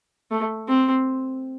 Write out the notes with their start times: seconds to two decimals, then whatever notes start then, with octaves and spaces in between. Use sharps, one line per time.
0.31 A3
0.68 C4